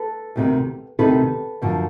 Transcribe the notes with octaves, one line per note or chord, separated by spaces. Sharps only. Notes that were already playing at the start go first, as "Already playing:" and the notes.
Already playing: A4 B4
D2 C3 D#3
D2 C3 D#3 A4 B4
F#2 D3 F3